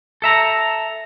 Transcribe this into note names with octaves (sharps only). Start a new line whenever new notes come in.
A4 E5 A#5